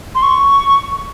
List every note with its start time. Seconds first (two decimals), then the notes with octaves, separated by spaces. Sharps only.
0.15 C6
0.23 C#6